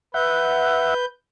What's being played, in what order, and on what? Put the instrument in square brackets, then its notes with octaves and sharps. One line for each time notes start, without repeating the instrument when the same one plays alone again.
[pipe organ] B4 G6 [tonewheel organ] E5 F#5